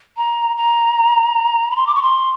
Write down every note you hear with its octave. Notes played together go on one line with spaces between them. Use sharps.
A#5
A#5
B5
C6
D6
C#6
C6